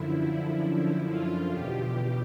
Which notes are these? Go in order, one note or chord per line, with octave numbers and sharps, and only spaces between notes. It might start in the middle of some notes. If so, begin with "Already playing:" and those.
Already playing: F#2 D3 F3 E4
F#2 D3 F3 E4
F4
E2 B2 G4